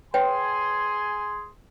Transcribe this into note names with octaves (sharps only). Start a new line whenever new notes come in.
G#4 B4 C#5 G5 G#5 C6